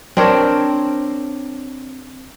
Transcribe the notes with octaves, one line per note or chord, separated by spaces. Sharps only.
C4 D4 A#4 C#5